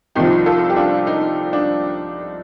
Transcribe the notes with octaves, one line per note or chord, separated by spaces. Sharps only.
C2 C3 F3 D#4 G4
F4 A4
G4
D4 F4
D#4
D4